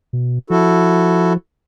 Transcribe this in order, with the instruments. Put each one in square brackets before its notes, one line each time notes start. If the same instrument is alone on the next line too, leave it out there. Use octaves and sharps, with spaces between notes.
[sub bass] B2
[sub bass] F3 [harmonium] E4 F#4 A4